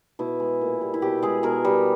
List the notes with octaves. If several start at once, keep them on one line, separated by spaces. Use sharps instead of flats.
B2 E4
G#3
A#2
G3
E4
B2 G4
G#3 G#4
B2 A#4
G3